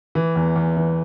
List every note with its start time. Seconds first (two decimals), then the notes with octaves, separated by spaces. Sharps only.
0.15 E3
0.36 E2
0.56 E2
0.77 E3